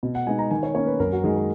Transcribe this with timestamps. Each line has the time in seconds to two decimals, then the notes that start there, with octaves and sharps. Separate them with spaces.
0.03 B2
0.15 F#5
0.27 G#3 B3 D#4 G#5
0.39 A#5
0.51 D#3 G#5
0.63 C#5
0.75 A#3 C#4 C#5
0.87 B4
1.00 F#2 A#4
1.12 F#4
1.23 D#3 G#3 G#4
1.36 A#4